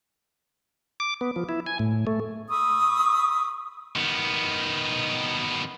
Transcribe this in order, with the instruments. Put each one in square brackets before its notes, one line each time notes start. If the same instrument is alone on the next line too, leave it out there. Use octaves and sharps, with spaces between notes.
[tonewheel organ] D6
B3
F3
E4
G#5
A2
A3
[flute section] B5 C#6 D#6 E6
[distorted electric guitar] D#3 B3